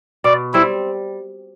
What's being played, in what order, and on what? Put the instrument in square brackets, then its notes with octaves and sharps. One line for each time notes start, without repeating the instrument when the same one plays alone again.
[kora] B2 [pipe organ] D5
[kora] G3 C4 [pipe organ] E4